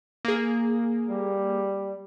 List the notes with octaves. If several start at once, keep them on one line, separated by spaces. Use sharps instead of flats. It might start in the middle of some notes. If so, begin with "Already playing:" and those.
A#3 G#4
G3